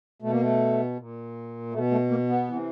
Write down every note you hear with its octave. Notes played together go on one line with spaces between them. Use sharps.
B2 A3
A#3
A3
A#2
B2 A3
A3
A#3
B3
C3 E3